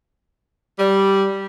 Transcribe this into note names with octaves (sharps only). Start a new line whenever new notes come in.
G3